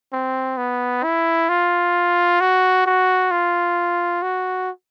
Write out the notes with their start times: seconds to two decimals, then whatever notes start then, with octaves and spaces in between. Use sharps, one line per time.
0.13 C4
0.57 B3
1.04 E4
1.49 F4
2.40 F#4
2.86 F#4
3.31 F4
4.22 F#4